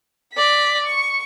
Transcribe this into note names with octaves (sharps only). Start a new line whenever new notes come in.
D5 B6
C#6